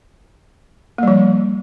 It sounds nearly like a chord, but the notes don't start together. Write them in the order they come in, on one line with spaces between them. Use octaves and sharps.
A#3 G3 F3